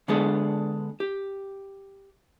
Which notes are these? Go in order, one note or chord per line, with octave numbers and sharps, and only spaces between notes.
D3 G#3 B3 D4 G#4 A4
G4